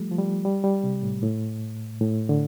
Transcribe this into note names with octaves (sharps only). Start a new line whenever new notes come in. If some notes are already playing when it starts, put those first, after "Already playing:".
Already playing: F3 G3 A3
F3
G3
G3
G3
C3
A2
A2
A2
D3